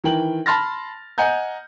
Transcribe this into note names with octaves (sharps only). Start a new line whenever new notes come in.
D#3 E3 A#4 G5 F#7
A5 B5 C6 F6 A6 A#6
D#5 F#5 G#5 A#5 G6